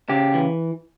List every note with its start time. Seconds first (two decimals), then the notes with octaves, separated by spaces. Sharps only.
0.09 C#3 G4
0.34 E3